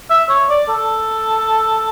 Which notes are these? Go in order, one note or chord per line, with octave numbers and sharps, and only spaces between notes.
E5
C#5
D5
A4